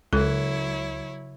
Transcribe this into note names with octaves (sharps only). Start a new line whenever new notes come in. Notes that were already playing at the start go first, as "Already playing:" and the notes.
C#2 C#3 F#3 E4 A4 C#5